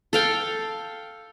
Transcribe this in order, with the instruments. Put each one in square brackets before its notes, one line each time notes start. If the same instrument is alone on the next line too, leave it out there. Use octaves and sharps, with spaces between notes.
[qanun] A4 F5 G5